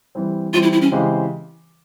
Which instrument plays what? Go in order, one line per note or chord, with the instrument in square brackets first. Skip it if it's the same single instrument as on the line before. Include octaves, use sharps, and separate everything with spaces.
[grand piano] E3 G3 C4
[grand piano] E3 G3 C4 [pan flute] F4
[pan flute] E4
E4
C#4
[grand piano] C#3 E3 G#3 C4 G4